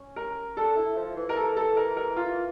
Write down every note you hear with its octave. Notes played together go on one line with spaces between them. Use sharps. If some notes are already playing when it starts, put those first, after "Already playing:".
Already playing: C#4
A#4
D4 A4
E4
F3
E3
A#4
A4
A4
A#4
A#4
F4